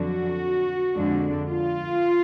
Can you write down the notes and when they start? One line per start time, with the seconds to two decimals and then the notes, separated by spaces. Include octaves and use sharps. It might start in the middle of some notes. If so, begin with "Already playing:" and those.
Already playing: F2 D3 F#3 F#4
0.96 F2 D3 G#3 D4
1.49 F4